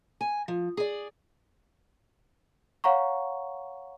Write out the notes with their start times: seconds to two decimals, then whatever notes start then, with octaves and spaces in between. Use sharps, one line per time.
0.21 G#5
0.48 F3
0.77 G#4 D5
2.84 C#5 F5 F#5 A#5 C#6